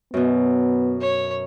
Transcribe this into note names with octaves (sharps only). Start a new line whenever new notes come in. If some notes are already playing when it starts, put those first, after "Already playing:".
F#2 B2 B3
C#5